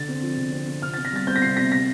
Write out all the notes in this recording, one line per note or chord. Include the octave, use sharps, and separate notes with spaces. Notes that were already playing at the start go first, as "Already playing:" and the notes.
Already playing: D3 A6
C4
F3
D3
C4
C4
C3 F6
A6
C4
A#6
G3 A6
C4 G6
A#6
C3 C7
C3 A#6
A#6